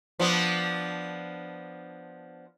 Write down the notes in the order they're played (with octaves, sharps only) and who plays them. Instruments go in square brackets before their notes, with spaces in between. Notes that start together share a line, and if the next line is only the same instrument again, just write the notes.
[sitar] F3 B3 D4